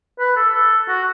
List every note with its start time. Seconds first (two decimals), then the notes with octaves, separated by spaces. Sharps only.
0.19 B4
0.36 A4
0.54 A4
0.89 F#4